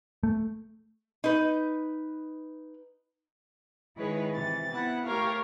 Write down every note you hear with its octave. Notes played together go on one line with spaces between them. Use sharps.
A3
D#4 B4
D#3 G#3 E4 G#4 B4 C#5
C3 E3 A6
B3 E4 F#5
A3 G4 A#4 C#5 F5